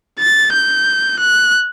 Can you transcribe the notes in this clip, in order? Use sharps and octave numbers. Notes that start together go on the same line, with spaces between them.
A6
G6
F#6